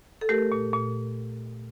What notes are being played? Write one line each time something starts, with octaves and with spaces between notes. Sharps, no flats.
A4
A3 G4 A#4
A#2
A#2